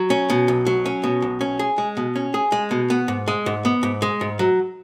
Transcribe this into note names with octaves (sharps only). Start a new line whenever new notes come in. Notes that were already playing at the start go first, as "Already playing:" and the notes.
Already playing: F#3
C#4
B2
B1
F#3
C#4
B2
B1
C#4
G#4
G#3
B2
C#4
G#4
G#3
B2
B3
G#2
G#3
G#2
B3
G#2
G#3
G#2
F#3